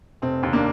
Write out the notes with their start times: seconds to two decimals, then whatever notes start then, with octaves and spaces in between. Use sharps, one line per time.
0.22 F1 C4
0.43 D#2
0.53 A#3 D4